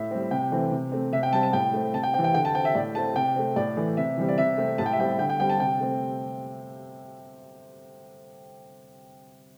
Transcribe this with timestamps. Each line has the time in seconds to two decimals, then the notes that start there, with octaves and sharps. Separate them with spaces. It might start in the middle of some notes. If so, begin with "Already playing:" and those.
Already playing: A2 E5
0.11 G3 C4
0.31 C3 G5
0.52 E3 A3 C4
0.72 C3
0.92 A3 C4
1.13 C3 E5
1.23 G5
1.33 G3 C4 A5
1.43 A5
1.53 A2 G5
1.74 A3 C4
1.94 C3 A5
2.03 G5
2.14 E3 C4 G5
2.24 G5
2.34 D3 G5
2.45 A5
2.55 C4 G5
2.65 E5
2.75 A2 D5
2.95 A3 C4 A5
3.16 C3 G5
3.36 A3 C4
3.56 A2 D5
3.77 E3 A3
3.97 C3 E5
4.18 E3 G3 C4
4.28 D5
4.38 C3 E5
4.58 A3 C4
4.78 A2 A5
4.86 G5
4.93 E5
4.99 G3 C4 G5
5.19 D3 G5
5.30 G5
5.40 G3 C4 G5
5.50 A5
5.60 C3 G5
5.80 A3 C4